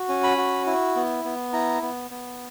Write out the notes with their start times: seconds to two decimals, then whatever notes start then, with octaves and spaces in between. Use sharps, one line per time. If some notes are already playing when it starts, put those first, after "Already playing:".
Already playing: F#4
0.09 C#4
0.24 B5
0.37 F#4
0.66 E4
0.96 B3
1.24 B3
1.53 E4 A#5
1.82 B3
2.11 B3